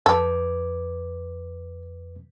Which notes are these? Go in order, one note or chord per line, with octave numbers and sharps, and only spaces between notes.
F2 A4 B4 D6